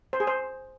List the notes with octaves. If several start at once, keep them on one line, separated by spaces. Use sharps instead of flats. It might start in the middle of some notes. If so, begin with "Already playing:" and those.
C5
G#4
C5